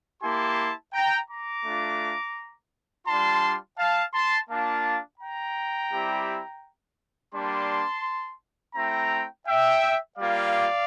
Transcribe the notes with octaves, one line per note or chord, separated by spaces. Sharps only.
A#3 E4 G4 A5 C6
G5 A#5
A#5 D6
A3 D4 F4
G3 D4 F4 A5 C6
F5 A5
A5 C6
A#3 D4 F4 F5 A5
G5 A#5
G3 C4 E4 G4
G3 A#3 D4 A5 C6
A3 C4 E4 G5 A#5
E5 G5
G3 A#3 F4 D5 F5